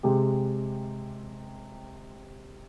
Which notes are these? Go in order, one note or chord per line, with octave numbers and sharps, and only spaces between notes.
C3 G#3 G4